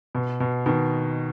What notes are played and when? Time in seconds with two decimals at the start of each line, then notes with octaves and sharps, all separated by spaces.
0.15 B2
0.40 B2
0.66 B2 D#3